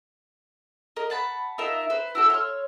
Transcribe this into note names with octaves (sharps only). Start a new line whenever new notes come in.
A#4 D#5
F#5 A5 B5
D#4 F4 A#4 E5
B4 C5
E4 F#4 A4
C#5 C6 F6